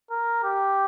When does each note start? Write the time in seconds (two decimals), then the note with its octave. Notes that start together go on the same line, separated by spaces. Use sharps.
0.11 A#4
0.44 G4